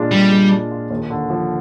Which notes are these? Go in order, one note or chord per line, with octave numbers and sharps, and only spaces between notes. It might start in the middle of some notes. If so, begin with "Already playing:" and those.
Already playing: A#2 G#3 D4 F4
A#2 G3
G#3
D4
F4
D#2
D3
F3